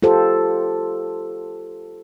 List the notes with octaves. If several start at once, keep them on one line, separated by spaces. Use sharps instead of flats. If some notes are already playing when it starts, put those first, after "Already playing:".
F4 G4 A4 C5